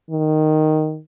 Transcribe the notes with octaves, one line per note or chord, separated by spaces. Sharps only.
D#3